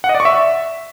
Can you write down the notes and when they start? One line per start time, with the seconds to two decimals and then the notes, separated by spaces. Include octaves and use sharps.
0.04 F#5
0.09 D#5
0.15 D5
0.20 C#6
0.25 E5